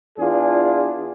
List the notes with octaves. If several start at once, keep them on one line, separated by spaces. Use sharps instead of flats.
E2 D4 F4 G#4